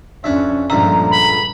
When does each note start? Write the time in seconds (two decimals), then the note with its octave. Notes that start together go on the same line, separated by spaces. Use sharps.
0.24 F2 C#4 D4 E5
0.70 C#2 G2 A#2 D3 F3 E5 A#5
1.11 B5